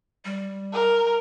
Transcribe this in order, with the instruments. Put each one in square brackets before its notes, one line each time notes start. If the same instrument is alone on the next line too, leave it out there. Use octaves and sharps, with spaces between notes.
[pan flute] G3
[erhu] A#4